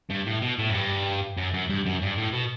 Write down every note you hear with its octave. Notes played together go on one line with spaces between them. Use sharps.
G2
A2
B2
A2
F#2
G2
F#2
F#2
G2
F#2
G2
A2
B2